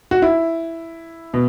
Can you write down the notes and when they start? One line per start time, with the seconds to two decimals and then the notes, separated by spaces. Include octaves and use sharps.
0.11 F#4
0.22 E4
1.34 B2